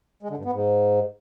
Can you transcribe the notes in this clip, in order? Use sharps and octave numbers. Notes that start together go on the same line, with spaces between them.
G#3
D3
G2
B3
G#2